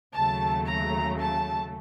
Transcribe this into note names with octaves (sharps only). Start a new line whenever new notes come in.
D#2 C#3 F#3 A3 A5
A#5
A5